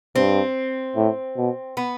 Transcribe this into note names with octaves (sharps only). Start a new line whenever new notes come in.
G2 C4
A2
B2
B3